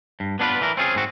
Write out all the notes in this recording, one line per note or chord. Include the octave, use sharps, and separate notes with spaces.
G2
B3 D4 E4 F4 B4
E3 A#4
C4 C#4 F4 G#4
G#2 C4 F#4